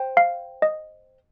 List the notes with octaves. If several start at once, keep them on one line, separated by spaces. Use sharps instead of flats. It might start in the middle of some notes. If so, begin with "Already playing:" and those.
Already playing: C5 G5
F5
D#5